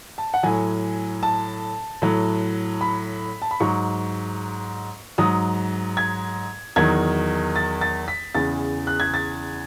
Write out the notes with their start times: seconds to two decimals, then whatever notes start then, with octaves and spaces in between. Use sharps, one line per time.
0.18 A5
0.34 F#5
0.43 A2 F#3 G#5
1.23 A5
2.02 A2 F#3
2.81 B5
3.42 A5
3.51 B5
3.60 G#2 F#3 C#6
5.18 G#2 F#3 D#6
5.97 G#6
6.76 E2 D#3 F#3 G#6
7.56 A6
7.81 A6
8.08 B6
8.35 E2 C#3 E3 A6
8.87 F#6
9.00 G#6
9.14 A6